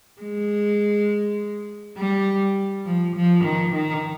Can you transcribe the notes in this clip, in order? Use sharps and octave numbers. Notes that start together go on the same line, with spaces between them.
G#3
G3
F3
F3
D#3
D#3